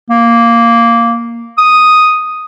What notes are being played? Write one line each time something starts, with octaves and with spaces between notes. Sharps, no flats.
A#3
D#6